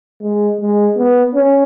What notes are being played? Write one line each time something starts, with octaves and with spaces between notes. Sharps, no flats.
G#3
G#3
B3
C#4